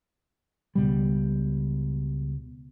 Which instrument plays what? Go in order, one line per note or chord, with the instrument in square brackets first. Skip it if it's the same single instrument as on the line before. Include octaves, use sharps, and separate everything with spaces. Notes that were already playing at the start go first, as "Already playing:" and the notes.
[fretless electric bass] C#2 B2 G3